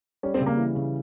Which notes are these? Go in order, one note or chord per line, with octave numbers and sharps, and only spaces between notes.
G3 C#4
C4
C#3
A#3
E3
C#3